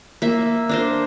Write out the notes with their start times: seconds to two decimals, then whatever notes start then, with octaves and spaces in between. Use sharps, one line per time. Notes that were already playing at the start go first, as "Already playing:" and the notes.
0.22 A#3 E5
0.69 D4 A#4 C5